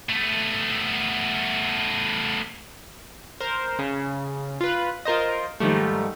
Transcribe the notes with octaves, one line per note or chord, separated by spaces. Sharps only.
A3 B3
A#4 C5
C#3
F4 B4
F4 A#4 C5 D#5
G#2 D#3 F3 G3 A3